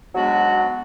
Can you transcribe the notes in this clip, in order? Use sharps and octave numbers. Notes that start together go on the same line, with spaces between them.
G#2 F#3 G#3 B3 D4 F#4